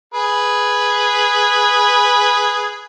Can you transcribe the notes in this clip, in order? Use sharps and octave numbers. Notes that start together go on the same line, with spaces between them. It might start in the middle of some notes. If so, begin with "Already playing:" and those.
G#4 B4